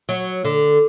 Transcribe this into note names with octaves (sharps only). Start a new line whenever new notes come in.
F#3
D3